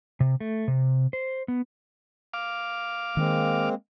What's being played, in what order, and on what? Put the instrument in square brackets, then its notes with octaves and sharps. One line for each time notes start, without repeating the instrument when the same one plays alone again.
[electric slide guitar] C3
A3
C3
C5
B3
[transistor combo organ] F5 D6
[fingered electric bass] D#3 [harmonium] G#3 A#3 C4